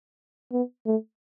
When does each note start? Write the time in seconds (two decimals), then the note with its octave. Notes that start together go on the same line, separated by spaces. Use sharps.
0.52 B3
0.86 A3